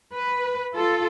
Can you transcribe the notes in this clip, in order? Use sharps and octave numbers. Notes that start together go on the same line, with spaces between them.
B4
F4 A4